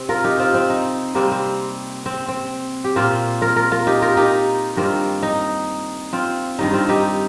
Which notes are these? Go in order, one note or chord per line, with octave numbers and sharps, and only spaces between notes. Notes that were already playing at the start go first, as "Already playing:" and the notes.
Already playing: C3 C4
F4 A#4
D#4 G4
C4 F4
C4
D#4
C3 G3 A#3 C4
C4
C4
C4
G4
A#2 A#3 C4 F4
F4 A#4
F4 A#4
F4 A#4
D#4 G4
F4 A#4
D#4 G4
G2 D#3 A#3 C4 F4
D#4
C4 F4
G2 D#3 G3 D#4
C4 F4
D#4 G4